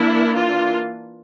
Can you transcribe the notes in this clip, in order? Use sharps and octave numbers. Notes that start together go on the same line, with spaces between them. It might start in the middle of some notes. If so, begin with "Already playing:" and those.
Already playing: E3 A#3 D4 E4
F4